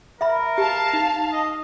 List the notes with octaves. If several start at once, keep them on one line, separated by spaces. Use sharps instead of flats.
A#4 E5 B5
G4 F5 A5
D#4
D#5